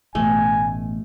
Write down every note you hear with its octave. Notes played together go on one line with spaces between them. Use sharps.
A1 B2 A3 G#5